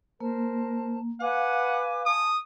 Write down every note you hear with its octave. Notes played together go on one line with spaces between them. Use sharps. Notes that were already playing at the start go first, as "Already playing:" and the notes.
A#3 A#4 C5 A5
B4 F5 F#5 G#5 D6
G#5 A5 D#6